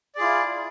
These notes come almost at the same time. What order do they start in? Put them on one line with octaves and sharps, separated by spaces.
D5 G#4 F4 E4